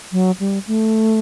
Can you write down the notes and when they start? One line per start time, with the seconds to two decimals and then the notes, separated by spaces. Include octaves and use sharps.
0.12 F#3
0.40 G3
0.67 A3